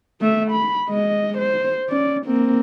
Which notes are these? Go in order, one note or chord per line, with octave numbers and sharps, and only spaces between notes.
A3 E5
B5
G#3 D#5
C5
C#4 D5
A#3 C4